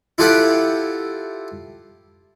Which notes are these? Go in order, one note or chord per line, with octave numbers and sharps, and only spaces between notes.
E4 F4 G4 A4 F#5 G5